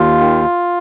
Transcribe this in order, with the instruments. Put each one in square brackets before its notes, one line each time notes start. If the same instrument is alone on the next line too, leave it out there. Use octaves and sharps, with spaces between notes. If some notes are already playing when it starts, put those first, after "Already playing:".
Already playing: [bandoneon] D#2 F4
D#3